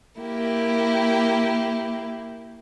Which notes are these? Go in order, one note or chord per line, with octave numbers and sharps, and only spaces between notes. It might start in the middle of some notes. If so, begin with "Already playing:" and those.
A#3 E4 G4